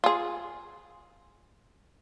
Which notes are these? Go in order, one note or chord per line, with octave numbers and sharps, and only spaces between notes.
F4 G#4